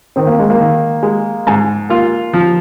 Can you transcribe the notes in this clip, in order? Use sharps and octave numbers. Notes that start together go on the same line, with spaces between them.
D#3 C4
A#3
G#3
A#3
D#3
G#3
G#2
A#3 F4
F3